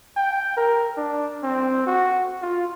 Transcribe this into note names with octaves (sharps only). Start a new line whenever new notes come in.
G5
A#4
D4
C4
F#4
F4